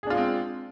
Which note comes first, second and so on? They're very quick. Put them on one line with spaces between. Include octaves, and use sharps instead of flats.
G#4 D4 F4 G#3 C4